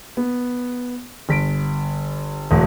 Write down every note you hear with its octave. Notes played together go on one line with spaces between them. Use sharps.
B3
G1 B6 D7
E1 D2 D3